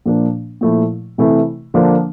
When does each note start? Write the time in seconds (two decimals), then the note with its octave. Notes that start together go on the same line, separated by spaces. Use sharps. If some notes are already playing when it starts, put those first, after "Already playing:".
0.06 A#2 F3 A#3 D4
0.61 A#2 F3 A3 E4
1.18 C3 E3 A3 E4
1.74 D3 F3 A#3 D4